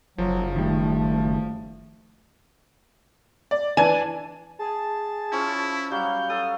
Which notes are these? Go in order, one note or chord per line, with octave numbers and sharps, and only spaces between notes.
F#1 F3 F#3
D#3 G3 A3
D5
E3 D4 G#5 A5
G#4 A5
F3 C#4 E4 C#5
F#3 G3 F5 G6
A4 F5 D#6